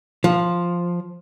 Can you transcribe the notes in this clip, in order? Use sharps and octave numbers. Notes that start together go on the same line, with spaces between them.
F3